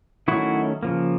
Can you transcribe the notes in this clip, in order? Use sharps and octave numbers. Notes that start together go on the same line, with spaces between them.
D#3 F#3 A3 C#4 E4 F#4
C#3 F3 A#3